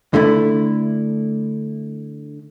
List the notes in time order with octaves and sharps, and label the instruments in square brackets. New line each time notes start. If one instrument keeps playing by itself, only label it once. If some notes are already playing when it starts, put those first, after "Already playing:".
[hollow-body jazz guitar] D3 A3 E4